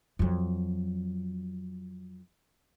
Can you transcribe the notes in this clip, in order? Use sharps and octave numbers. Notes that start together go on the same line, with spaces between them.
F2 F#3